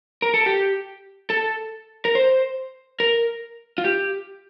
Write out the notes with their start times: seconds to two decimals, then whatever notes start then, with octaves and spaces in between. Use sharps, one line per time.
0.22 A#4
0.34 A4
0.46 G4
1.30 A4
2.05 A#4
2.15 C5
3.00 A#4
3.78 F4
3.84 G4